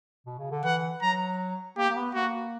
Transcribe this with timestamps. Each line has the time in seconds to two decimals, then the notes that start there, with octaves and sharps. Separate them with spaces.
0.26 B2
0.39 C#3
0.51 D3
0.64 E3 F#5
1.02 F#3 A#5
1.77 A#3 G4
1.90 A#3
1.96 B3
2.15 A#3 F#4